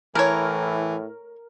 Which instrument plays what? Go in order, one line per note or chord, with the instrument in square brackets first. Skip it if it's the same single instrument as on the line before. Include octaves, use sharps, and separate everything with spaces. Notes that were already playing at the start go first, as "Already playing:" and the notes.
[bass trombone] A2 [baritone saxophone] E3 [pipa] A3 C#5 [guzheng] A#4